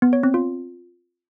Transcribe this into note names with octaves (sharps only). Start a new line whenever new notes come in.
B3
C#5
C4
F4